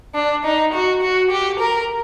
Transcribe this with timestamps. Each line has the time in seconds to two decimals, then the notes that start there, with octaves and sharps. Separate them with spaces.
0.15 D4
0.44 D#4
0.73 F#4
1.02 F#4
1.31 G4
1.59 A#4